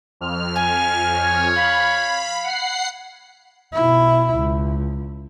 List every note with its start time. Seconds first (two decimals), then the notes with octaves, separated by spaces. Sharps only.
0.21 F2 F6
0.55 G#5
1.14 C#5
1.56 F5 B5
2.44 F#5 C7
3.73 B2 E4
4.35 C#2